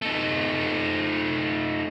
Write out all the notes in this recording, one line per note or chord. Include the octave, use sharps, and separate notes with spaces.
A3 D#4